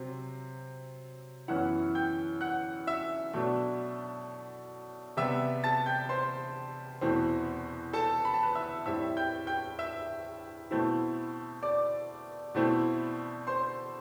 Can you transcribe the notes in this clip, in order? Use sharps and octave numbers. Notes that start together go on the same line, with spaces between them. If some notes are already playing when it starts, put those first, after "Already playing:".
Already playing: C3 F#3 C4
F#2 E3 B3 E4 F#5 F#6
G5 G6
F#5 F#6
E5 E6
B2 F#3 A3 D4
C3 G3 B3 E5 E6
A5 A6
G5 G6
C5 C6
E2 B2 A3 C4 E4
A4 A5
B5
A5
B4 B5
E5 E6
A2 G3 C4 E4 E5 E6
G5 G6
G5 G6
E5 E6
B2 A3 C4 E4
D5 D6
B2 A3 C4 E4
C5 C6